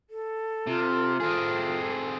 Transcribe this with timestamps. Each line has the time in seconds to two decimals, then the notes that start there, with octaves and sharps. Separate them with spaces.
0.10 A4
0.67 C3 F4
1.20 C4 G#4 A4